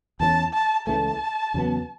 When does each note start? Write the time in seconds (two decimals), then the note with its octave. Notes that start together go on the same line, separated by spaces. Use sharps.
0.20 E2 E3 A3 C#4 A5
0.53 A5
0.87 C#2 C#3 E3 A3 A5
1.54 E2 C#3 F#3 B3